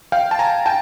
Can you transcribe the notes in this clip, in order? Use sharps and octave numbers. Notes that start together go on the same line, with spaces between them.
F5 G5
A5
G#5 A#5
G5 A5